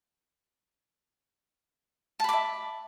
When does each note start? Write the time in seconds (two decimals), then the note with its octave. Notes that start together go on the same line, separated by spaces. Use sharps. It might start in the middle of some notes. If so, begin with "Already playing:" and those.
2.20 A5
2.24 B5
2.29 D6
2.33 E5